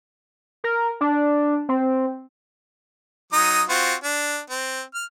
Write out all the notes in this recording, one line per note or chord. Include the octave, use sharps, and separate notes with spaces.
A#4
D4
C4
F#3 D#4 D#6
C4 F4 F#4
D4
C4
F6